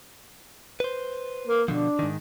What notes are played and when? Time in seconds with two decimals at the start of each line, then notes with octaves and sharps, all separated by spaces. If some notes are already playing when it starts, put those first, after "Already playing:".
0.80 B4 C5
1.48 A#3
1.68 B2 D3 F3 D4
1.99 G#2 D#3